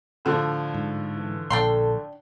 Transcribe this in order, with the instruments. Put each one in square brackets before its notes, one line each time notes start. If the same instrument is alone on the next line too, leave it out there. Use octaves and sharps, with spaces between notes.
[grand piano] A2 D3 F3
[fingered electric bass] G#2
[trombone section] E3
[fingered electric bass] A#1 [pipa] D4 G5 C6 [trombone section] A4